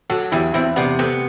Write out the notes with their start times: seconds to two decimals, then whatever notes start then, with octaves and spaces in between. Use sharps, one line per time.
0.10 F#3 F#4 A4
0.32 E2 E4 G4
0.54 E2 C4 E4
0.76 C3 B3 D4
0.99 A3 B3 C4